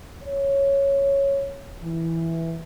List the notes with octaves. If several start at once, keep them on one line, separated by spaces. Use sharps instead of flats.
C#5
E3